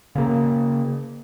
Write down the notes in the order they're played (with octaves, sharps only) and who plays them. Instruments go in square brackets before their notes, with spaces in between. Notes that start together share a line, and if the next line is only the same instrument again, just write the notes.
[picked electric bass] C#3 A#3